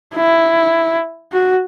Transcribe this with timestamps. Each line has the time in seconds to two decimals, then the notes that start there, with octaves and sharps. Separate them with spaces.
0.15 E4
1.33 F#4